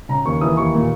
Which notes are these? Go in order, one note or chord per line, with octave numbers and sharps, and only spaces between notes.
C#3 A#5
D#2 C#6
E3 D#6
D#2 C#6
A#2